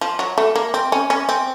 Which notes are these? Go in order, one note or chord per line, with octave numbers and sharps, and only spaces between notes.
F3
F#3
A3
A#3
C4
C#4
C#4
C4